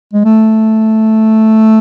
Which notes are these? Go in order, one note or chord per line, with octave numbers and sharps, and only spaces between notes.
G#3
A3